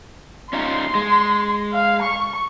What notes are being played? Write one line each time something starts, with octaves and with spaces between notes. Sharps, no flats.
C#4 D#4 F4 C6
G#3
F5
C#6